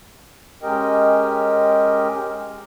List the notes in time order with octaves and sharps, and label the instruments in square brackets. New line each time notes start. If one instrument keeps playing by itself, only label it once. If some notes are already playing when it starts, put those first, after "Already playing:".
[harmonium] G#3 C#4 G4 A#4 D#5 G5